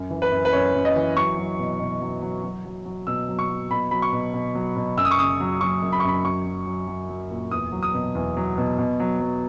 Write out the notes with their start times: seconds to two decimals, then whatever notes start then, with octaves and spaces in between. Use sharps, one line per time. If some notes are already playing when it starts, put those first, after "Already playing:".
Already playing: F#2
0.10 E3
0.22 B4
0.31 F#2
0.45 B4
0.53 F#2 C#5
0.74 F#2
0.85 D#5
0.96 E3
1.16 F#3 C#6
1.38 F#3
1.59 B2
1.80 B2
2.01 F#3
2.22 F#3
2.44 F#3
2.65 F#3
2.85 F#3
3.07 B2 E6
3.29 F#3
3.39 C#6
3.49 F#3
3.71 B2 B5
3.91 F#3 B5
4.02 C#6
4.12 B2
4.34 B2
4.55 F#3
4.76 B2
4.97 F#2 E6
5.05 D#6
5.11 C#6
5.18 C#3 D#6
5.40 F#3
5.61 F#3 C#6
5.82 F#2
5.92 B5
6.00 C#6
6.04 F#2 B5
6.24 F#3 C#6
6.46 F#3
6.66 F#3
6.87 F#3
7.09 F#3
7.30 A#2
7.51 E2 D#6
7.72 F#3
7.83 D#6
7.94 B2
8.15 E2
8.37 F#3
8.58 B2
8.78 B2
9.00 F#3
9.20 F#3